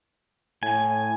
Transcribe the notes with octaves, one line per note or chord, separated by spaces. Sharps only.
A2 G#5